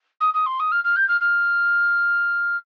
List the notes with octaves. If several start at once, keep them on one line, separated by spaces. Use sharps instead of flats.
D#6
D#6
C6
D#6
F6
F6
G6
F6
F6